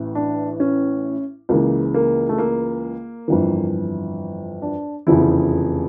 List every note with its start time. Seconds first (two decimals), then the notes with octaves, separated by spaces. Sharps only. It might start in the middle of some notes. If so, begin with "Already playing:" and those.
Already playing: A1 A2 E3
0.15 D4
0.60 C#4
1.49 C#2 C#3 E3 A#3
1.94 A#3
2.29 A3
2.38 A#3
3.28 G1 F2 E3
4.62 D4
5.07 F1 E2 C#3 F3 E4